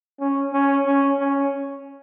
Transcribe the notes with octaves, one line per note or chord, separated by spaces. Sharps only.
C#4
C#4
C#4
C#4